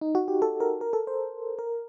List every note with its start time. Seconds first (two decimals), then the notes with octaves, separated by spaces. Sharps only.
0.01 D#4
0.15 F#4
0.28 G4
0.42 A4
0.60 A#4
0.81 A#4
0.93 A4
1.07 C5
1.59 A#4